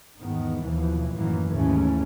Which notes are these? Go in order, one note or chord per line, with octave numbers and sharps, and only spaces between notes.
E2 G#2 D#3 B3
D#2 B2 E3 F3
F#2 A2 D#3 E3 F#3 A#3
D#2 G#2 C#3 E3 A3 C#4